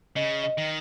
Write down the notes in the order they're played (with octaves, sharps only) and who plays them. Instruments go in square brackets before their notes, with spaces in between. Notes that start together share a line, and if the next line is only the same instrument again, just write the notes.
[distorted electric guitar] C#3 [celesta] D#5
[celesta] D#5
[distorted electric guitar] D#3